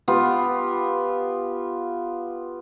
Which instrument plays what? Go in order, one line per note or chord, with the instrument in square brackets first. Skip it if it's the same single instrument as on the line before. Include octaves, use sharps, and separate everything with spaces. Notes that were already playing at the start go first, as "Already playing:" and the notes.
[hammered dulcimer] B3 F4 G4